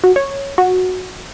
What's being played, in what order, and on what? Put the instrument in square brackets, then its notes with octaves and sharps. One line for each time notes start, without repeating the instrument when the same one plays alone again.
[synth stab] F#4
C#5
F#4